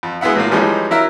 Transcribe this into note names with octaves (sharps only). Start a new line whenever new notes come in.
F2
G#3 B3 E4 E5 F#5
A2 F#3 A#3 F4
E3 F3 G3 G#3 C#4 D#4
F#3 E4 A#4 E5